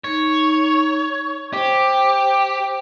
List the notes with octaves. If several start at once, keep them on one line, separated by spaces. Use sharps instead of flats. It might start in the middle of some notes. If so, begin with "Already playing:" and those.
D#4 C#5
G4 C5